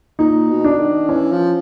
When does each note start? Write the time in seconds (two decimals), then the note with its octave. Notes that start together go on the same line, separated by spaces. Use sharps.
0.19 A#2 D#4
0.50 B2
0.64 D4
0.79 D#3
1.09 E3 C#4
1.32 F3